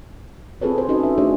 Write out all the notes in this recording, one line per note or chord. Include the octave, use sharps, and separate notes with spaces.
C4 F4 G#4 A4 B4 C#5
A4 C5
C#4 D#4 F#4 A4 D#5
E5
A3 D4 F#4 G#4 C5 C#5